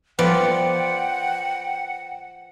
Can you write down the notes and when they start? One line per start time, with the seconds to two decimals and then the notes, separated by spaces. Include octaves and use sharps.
0.19 F3 B3 D5 F#5 G5